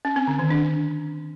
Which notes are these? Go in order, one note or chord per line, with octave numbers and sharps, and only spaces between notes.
C#4
C4
D3
D#3
D4